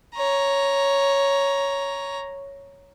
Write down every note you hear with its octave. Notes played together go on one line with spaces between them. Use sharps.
C#5 A#5